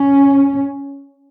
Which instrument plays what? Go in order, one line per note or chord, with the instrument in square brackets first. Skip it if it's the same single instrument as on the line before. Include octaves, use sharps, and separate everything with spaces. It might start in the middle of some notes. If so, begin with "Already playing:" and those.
Already playing: [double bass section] C#4